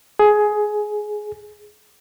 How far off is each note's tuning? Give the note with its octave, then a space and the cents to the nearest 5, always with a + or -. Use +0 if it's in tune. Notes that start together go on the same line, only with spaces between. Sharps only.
G#4 +15